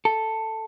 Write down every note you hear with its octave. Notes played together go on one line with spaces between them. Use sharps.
A4